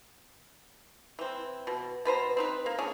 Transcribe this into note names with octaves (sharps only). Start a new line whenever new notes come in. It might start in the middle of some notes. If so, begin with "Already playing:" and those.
E3 C4
B2
B2 B4 C5 A#5
C4 D#4 B4
A#3
C#4 D4 G#4